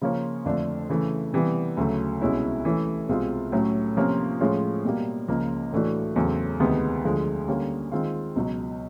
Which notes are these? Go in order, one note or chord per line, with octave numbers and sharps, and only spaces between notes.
C#3 F3 A#3 C#4
F2 D3 F3 A3 D4
C#3 E3 A3
C3 E3 G3 B3
D2 C#3 F#3 A3
C2 B2 G#3 C#4 E4
E3 A3 C#4 E4
C2 B2 G#3 C4 F4
A2 F#3 A3 C#4
C3 F3 A#3 C#4 F4
A2 F3 G#3 C#4 F4
B2 G3 A#3
C#2 C#3 F3 A#3
A2 E3 A3 D4 F#4
E2 C#3 F#3 A3 C4
D2 C3 D#3 G#3 B3
D2 D3 F3 G#3
D3 G3 A#3 C#4
D#3 G#3 C4 F4
C#2 B2 F#3